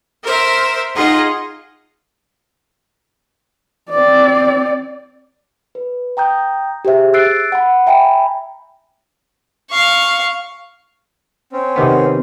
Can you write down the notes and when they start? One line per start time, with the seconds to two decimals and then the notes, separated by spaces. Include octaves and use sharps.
0.22 A#4 C5 E5
0.94 D#4 F4 G#4 D#5 F#5
3.90 C4 D5
5.75 B4
6.17 G5 A#5 D#6 G6
6.85 G4 G#4 C5 E5
7.14 E6 F#6 A6 C7 D7
7.52 F#5 B5
7.87 E5 G5 G#5 A#5 B5
9.70 F5 C#6
11.52 C4 C#4
11.76 C3 D#3 B3